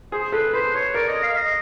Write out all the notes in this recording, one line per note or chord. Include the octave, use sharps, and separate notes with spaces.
G#4 C5
A4 B4
B4 C5
C#5
A#4 D5
D#5
F5
D#5